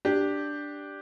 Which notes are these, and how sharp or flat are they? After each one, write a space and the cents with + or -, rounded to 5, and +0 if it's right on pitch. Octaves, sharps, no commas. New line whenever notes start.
D4 +0 G4 +0